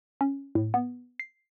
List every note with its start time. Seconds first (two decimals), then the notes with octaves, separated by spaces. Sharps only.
0.21 C#4
0.55 A2
0.74 B3
1.20 C7